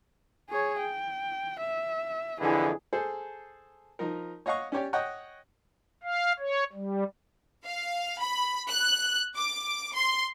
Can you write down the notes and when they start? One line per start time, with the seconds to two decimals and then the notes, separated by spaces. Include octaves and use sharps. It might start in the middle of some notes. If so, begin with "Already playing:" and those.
0.49 G#4 C#5
0.80 G5
1.61 E5
2.41 F2 D3 E3 E4 G#4
2.93 G#4 A4 C5
3.99 F3 D#4 A#4
4.46 C#5 D#5 F5 F#5 C#6
4.72 C#4 G4 C#5 D5
4.93 C#5 D#5 F#5 G5 C#6
6.03 F5
6.39 C#5
6.73 G3
7.65 F5
8.20 B5
8.69 F#6
9.36 D6
9.95 C6